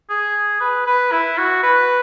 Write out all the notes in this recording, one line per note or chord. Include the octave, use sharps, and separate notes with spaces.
G#4
B4
B4
E4
F#4
B4